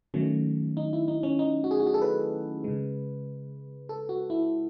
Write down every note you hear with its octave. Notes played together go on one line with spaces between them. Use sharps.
D#3 F#3 A3 C#4
D#4
E4
D#4
C#4
D#4
F#4
G#4
F#4
G#4
A4
B4
C#3 G#3
A4
F#4
E4